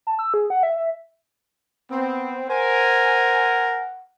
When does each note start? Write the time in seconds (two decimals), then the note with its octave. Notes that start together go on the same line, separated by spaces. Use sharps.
0.07 A5
0.19 E6
0.34 G#4
0.50 F#5
0.63 E5
0.77 E5
1.91 B3 C4
2.50 A#4 C5 F#5 G#5